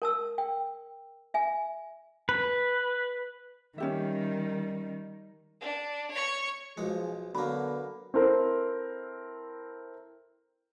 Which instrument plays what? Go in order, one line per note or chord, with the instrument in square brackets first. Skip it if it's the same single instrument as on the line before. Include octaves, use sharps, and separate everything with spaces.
[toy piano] A#4 A5 E6
G5
E5 G#5
[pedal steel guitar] B4
[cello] D#3 G3 [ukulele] C#4 G4 E5
[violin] D4
C#5 C#6
[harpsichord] B1 G#3 [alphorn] F3 [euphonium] G#4
[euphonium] D3 [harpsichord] F#3 A#3 [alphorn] B3 [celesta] B5
[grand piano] C4 E4 A4 A#4 C5